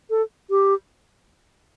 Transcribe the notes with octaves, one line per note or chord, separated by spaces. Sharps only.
A4
G4